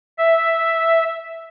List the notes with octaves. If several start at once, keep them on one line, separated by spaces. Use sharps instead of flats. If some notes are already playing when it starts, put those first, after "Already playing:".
E5